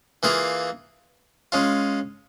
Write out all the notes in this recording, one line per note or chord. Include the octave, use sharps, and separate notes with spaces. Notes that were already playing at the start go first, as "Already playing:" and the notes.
E3 A#3 F4 G#4
G#3 C#4 F4